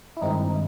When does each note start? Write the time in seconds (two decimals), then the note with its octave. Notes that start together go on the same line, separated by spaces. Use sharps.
0.17 E4
0.21 G2 D#3 G#3 C4 D#4